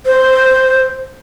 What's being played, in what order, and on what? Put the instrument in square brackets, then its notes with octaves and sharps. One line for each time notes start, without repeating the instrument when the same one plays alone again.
[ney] C5